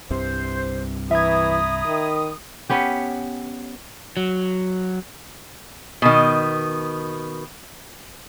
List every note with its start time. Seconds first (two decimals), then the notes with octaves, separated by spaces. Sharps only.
0.10 C2 G2 C3 C5
1.11 E3 E5 A#5 B5 D#6 G#6
1.86 D#3
2.69 B3 C#4 G4
4.17 F#3
6.02 B2 D#3